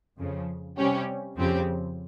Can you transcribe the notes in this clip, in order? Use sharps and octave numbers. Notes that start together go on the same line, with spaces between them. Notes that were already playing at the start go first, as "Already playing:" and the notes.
F2 C#3 F3
C3 G3 C#4 G4
F2 C#3 F3 C4 G4